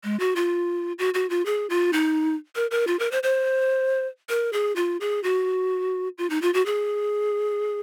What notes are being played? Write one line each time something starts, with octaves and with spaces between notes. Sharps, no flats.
G#3
F#4
F4
F#4
F#4
F4
G#4
F4
D#4
A#4
A#4
F4
A#4
C5
C5
A#4
G#4
F4
G#4
F#4
F4
D#4
F4
F#4
G#4